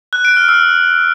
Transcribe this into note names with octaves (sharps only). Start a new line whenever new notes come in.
F#6
D7
F6
E6